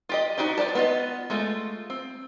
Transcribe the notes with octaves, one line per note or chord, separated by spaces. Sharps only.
F4 G4 D#5
D4 D#4 F#4 G4 C5
F4 C5 D5 A5
B3 F4 D#5
G#3 A3 F4
C4